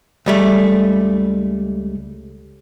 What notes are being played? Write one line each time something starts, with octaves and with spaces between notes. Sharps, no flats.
C#2 G3 A3